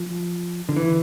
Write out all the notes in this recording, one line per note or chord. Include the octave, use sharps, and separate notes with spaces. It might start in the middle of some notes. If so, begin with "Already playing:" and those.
Already playing: F3
D3
E3